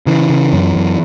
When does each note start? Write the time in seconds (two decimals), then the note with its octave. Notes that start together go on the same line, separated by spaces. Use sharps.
0.06 C#3 E3
0.30 C#3
0.53 F#2
0.76 F#2